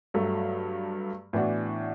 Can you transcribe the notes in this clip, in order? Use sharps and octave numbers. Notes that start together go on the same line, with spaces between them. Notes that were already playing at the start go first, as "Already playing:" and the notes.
G2 F#3 A3
A2 E3 B3 D4 F#4